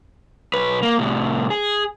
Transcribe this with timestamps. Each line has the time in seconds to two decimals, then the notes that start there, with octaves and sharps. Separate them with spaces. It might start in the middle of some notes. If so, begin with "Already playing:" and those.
0.54 B1 B4
0.83 A#3
0.99 C2 A2
1.50 G#4